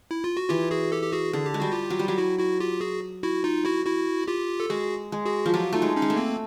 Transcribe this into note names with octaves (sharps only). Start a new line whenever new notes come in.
E4
F4
F#4
E3 F4 G4
F#4 G#4
G4 A4
G4
F#4 G#4
D3 G#4
G4
G#3
G3 F#4
F4 G4
F#3
G3
F#3 G4
E4 F#4
E4 F#4
F4 G4
F#4 G#4
E4 F#4
D#4 F4
E4 F#4
E4 F#4
F4 G4
A4
G#3 F#4 G#4
G#3
F#4 G#4
F3
F#3 F4 G4
A3 D#4 F4
G#3
C#4 D#4
G#3
A3
A#3 C4